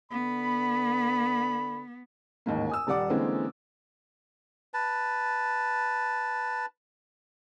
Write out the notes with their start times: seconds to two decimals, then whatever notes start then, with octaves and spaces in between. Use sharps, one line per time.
0.12 D3 B3 B5
2.46 A1 D#2 G#2 A#3
2.69 G#5 D#6 E6
2.87 D#1 G3 D5 F#5 D6
3.10 D3 E3 G#3 A#3 C4 C#4
4.74 B4 A5